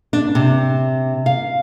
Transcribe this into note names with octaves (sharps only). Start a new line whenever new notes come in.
D4
C3
F5